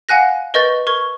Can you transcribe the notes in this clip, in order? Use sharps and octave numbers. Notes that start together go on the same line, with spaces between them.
F5 F#5 G#5 F#6 A#6
A#4 B4 D#5 C#6 G6 A6
A#4 C#6 G#6